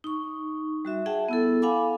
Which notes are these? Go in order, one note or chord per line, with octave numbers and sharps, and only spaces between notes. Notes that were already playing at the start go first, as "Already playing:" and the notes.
D#4 C#6
G3 F#4 E5
G#4 E5 F#5 G5 A5
B3 E4 A4
F5 F#5 G#5 B5 D6